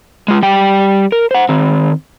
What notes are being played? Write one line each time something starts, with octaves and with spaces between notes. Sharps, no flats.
G#3 F4
G3 G5
A#4
C5 F#5
D#3 C4